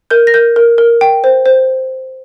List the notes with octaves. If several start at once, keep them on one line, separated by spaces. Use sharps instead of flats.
A#4 G6
A#6
A#4 G6
A#4
A#4
G5
C5
C5